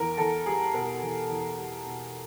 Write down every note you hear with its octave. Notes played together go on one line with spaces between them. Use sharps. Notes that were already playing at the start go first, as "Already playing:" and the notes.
Already playing: E2 A#4
E2 A4
G3 G#4
B2 A#4
E2
E2
G3
B2